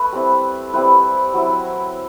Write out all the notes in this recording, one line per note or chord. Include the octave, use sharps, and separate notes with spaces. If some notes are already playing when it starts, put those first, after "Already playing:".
Already playing: A3 B4
G3 C4 E4
G3 C4 E4 B4
F#3 C4 E4